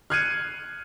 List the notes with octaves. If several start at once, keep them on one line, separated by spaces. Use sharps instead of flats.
F6 F#6 G#6 C7 C#7 D#7